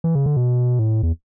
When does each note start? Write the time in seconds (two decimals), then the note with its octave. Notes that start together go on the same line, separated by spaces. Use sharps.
0.04 E3
0.15 C#3
0.26 D3
0.37 B2
0.79 A2
1.03 E2